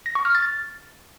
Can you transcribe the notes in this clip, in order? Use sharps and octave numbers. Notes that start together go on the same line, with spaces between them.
A#6
C#6
F6
A6